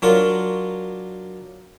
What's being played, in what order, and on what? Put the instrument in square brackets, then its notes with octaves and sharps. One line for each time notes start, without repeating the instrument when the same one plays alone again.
[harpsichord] F#3 D4 F4 A#4